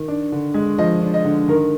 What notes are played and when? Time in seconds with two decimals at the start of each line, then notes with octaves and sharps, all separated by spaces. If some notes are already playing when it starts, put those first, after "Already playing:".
Already playing: D#3
0.08 D4
0.32 D3
0.54 G#3
0.78 F3 D#5
1.02 D4
1.14 D#5
1.25 D3
1.48 D#3 A#4